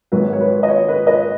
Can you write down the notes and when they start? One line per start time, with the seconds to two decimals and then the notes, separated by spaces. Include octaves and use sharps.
0.12 G#1 G#2 F#3 B4
0.33 C#5
0.40 B4
0.63 D#5
0.69 C#5
0.88 B4
1.07 B4 D#5